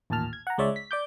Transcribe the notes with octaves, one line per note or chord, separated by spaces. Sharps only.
A1 D#2 A#2 A5 F6
G#6
F#5 A#5
C#2 G#3 C#5 D5 E5
B6
D5 D6 G6